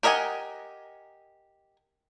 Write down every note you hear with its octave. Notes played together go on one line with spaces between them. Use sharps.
G4 A#4 D#5 F#5 G#5